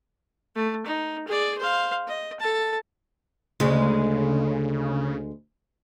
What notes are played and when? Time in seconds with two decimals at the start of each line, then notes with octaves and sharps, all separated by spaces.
0.55 A3
0.86 D#4
1.27 G#4 D5
1.58 C5 F5
2.07 D#5
2.40 A4 A5
3.60 D2 C#3 G#3